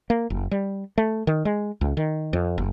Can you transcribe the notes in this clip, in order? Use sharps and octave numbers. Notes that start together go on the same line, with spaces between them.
A#3
F#1
G3
A3
D#3
G#3
C#2
D#3
F2
F#1